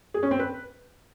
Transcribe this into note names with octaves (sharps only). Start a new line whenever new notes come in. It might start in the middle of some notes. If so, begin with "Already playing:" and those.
G#4
C#4
C4
B4